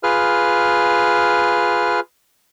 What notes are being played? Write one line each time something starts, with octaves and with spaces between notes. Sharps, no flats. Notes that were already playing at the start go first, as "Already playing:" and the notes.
F4 G#4 B4 F6